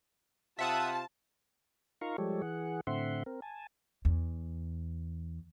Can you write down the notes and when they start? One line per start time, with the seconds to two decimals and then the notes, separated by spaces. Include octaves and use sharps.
0.59 C3 F4 C5 E5 F#5 A5 D#6
2.01 D#4 F4 A#4 F5 A#5 C#6
2.18 F3 G3 G#3 G4 A4 C#5
2.42 E3 G#4 F#5
2.87 A2 D3 C4 E5 F#5 C6
3.26 C4 A#4
3.42 G#5 A5
4.05 E2